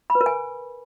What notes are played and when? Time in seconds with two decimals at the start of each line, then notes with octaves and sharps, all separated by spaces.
0.10 B5
0.15 B4
0.21 A#4
0.26 G#5